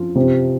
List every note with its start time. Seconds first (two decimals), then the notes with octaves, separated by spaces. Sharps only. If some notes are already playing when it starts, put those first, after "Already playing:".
Already playing: F3 F4
0.16 C3